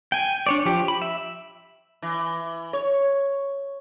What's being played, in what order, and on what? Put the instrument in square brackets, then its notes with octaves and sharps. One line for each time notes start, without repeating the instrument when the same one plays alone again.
[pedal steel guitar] G5 G#5
D4 C#5 D5
F3 G4
B5
E5
[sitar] E3
C#5